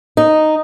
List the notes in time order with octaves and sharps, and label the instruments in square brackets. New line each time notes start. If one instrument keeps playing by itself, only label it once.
[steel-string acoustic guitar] D#4